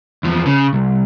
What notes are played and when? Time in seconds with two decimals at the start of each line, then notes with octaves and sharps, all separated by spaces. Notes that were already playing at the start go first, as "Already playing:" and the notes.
0.23 E2 F3
0.46 C#3
0.73 C2